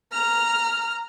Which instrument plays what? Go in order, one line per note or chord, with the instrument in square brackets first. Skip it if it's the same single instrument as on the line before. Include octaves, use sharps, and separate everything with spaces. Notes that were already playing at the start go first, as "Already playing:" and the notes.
[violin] A#5 F6